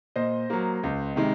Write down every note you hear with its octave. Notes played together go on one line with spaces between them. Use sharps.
A#2 C5 D#5
F#3 A#3
C#2
C3 D#3 G#3